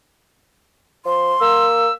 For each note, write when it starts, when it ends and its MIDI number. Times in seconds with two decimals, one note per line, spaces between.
1.05 1.34 53
1.05 1.65 84
1.41 1.89 58
1.41 1.92 88